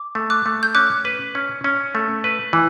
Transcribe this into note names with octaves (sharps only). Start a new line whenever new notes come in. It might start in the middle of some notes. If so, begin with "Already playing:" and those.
Already playing: D6
A3
D6 F#6
A3
G6
C#4 D6 F#6
B4
C#4
C#4
A3
B4
E3